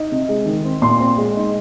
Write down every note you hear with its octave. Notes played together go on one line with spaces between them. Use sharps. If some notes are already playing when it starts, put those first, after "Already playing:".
Already playing: D#4
C3
G#3
D#3
C4
A#2 C6
C4
G#3
D#4